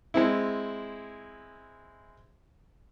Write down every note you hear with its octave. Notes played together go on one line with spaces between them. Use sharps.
G#3 C4 E4